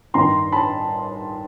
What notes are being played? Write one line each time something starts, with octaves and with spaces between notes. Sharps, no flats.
G2 D#3 A#5 C6
A5 B5